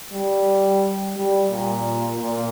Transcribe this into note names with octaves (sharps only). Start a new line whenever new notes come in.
G3
G3
A#2
A#2